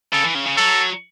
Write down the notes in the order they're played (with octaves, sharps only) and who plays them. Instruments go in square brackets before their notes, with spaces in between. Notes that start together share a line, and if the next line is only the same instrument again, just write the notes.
[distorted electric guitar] C#3 [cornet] A4
[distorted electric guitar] E3
C#3
C#3
[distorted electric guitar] F#3 [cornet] A4